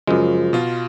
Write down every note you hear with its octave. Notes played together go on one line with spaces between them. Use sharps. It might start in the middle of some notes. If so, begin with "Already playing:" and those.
F#2 C#3 F3 G#3
B2 F4